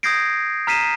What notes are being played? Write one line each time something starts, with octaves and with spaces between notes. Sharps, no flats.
D#6 G6 G#6 A#6 C7 D7
A#5 F6 B6 C7 D#7 E7